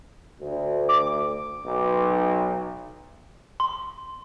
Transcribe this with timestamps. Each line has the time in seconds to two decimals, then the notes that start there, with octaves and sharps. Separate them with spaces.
0.40 D2
0.89 D6
1.66 B1
3.60 C6